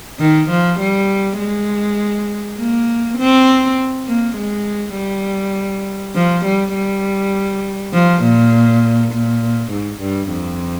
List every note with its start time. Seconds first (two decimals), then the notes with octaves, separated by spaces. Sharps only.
0.20 D#3
0.49 F3
0.79 G3
1.39 G#3
2.58 A#3
3.18 C4
4.06 A#3
4.36 G#3
4.95 G3
6.15 F3
6.45 G3
6.74 G3
7.93 F3
8.23 A#2
9.12 A#2
9.71 G#2
10.01 G2
10.31 F2